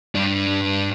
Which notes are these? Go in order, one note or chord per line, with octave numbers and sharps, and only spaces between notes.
G2 D4